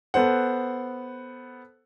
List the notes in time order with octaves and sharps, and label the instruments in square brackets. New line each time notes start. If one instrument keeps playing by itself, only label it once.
[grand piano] B3 A4 C5 F#5